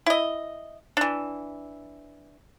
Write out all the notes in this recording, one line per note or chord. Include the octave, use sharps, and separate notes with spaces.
E4 D#5
E3 D4